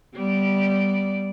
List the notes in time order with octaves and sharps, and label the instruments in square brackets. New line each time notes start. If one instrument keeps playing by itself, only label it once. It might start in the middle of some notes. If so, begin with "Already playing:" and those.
[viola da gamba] G3 B3 D5